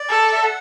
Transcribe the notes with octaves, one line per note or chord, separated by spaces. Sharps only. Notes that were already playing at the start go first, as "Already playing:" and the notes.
Already playing: D5
A4
E5
F#5